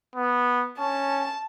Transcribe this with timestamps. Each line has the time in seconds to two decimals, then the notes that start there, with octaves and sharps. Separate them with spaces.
0.16 B3
0.79 C#4 A5